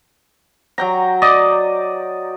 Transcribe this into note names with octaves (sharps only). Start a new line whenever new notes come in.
F#3 G5 A#5
D5 D#5